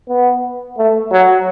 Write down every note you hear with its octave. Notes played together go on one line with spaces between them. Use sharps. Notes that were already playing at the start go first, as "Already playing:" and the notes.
B3
A3
F#3